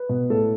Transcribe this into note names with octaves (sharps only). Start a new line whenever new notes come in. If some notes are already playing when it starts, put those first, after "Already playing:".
Already playing: B4
B2
A2 A4